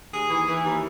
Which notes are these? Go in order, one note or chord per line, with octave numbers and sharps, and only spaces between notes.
D#2 G#4
E3
E3
D#2